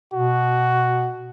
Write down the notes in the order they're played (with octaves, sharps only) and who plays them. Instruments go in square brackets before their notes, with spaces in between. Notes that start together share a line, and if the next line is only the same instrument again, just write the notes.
[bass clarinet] B2 [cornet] F#4